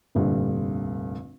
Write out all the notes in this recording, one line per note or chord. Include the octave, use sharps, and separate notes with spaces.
F1 A#1 G2 D3